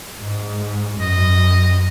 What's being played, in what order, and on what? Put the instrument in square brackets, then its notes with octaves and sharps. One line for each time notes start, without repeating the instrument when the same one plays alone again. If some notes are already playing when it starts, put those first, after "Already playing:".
[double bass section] G#2
[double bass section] F#2 [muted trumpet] D#5